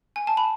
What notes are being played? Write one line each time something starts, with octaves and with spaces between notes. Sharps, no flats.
G#5
A5
B5